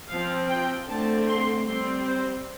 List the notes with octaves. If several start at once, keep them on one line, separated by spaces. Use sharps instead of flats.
F3 C4 F5
G5
D3 A3 C4 A5
C6
G3 C4 C6
C5